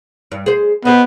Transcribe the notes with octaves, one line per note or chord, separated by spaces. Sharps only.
G2
G#4 C5
B3 G4 C5 D#5